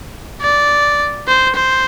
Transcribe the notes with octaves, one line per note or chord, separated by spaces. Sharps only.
D5
C5
C5